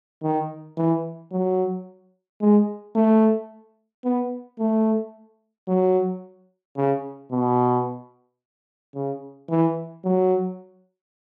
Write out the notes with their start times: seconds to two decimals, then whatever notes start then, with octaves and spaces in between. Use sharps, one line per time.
0.23 D#3
0.77 E3
1.32 F#3
2.41 G#3
2.95 A3
4.04 B3
4.59 A3
5.68 F#3
6.77 C#3
7.32 B2
8.95 C#3
9.50 E3
10.05 F#3